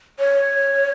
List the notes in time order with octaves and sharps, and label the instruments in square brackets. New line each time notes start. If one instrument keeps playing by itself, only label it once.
[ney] C#5